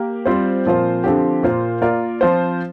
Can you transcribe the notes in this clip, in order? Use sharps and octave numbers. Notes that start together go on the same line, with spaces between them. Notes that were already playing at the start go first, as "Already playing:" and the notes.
Already playing: A#3 G4 A#4
G3 C4 F4 C5
A#2 F3 C4 F4 C5
D3 F3 C4 G4
A#2 A#3 F4 C5
A#3 F4 A#4 D5
F3 C4 F4 C5